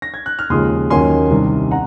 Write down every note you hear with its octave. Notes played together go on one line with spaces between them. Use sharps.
A#6
G#6
F#6
F6
D#2 C#3 F3 G#3 C6 D#6
D#2 D#3 F#3 A#3 C#4 G#5 C6
C2 C3 D#3
F#5 A#5